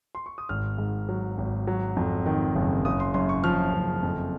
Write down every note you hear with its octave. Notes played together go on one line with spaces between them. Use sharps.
C6
C#6
D#6
G#1 F6
G#2
F#3
G#1
F#3
F2
D#3
F#1
F#1 D#6
C6
F#2 C6
C#6
F3 F6
F#1
F2